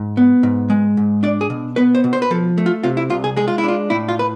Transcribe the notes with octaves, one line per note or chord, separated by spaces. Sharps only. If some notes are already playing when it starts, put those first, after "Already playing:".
Already playing: G#2
B3
G#2
G#3
G#2
D4 D5
G#4
B2
B3 B4
C5
B2
C5
B4
F3 A4
A3
F4
C3 F4
E4
C2 F4
G#4
G#3 G#4
F4
E4
D4 F4
A2 E4
F4
B4